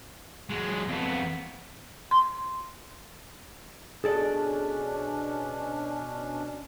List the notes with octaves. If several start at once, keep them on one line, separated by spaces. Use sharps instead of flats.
F#3 G#3
F2 B3
C6
B2 C#4 D4 G#4 A4 D5